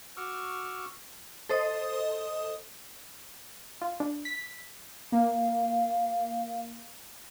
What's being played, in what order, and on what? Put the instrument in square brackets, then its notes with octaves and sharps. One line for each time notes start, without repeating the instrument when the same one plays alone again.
[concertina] F#4 C#6 D6 E6 F6
[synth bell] A4 C5 D#5 D#6
[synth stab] F4
D4
B6
[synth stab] A#3 [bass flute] F5